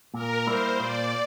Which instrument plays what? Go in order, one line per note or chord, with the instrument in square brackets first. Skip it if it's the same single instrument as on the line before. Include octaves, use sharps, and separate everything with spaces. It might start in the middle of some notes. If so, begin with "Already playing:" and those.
[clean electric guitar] A#2 [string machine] A#4
[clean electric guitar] G3 A#3 E4 [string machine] C5
[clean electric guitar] A#2 [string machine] D5